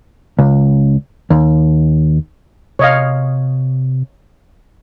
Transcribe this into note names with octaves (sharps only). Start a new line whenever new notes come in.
C#2
D#2
C3 C#5 D#5 F5